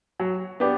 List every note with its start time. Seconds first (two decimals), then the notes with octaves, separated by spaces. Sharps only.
0.20 F#3
0.60 B3 D4 G4